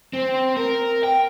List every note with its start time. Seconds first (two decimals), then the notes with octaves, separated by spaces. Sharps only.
0.13 C4
0.57 A#4
1.04 G5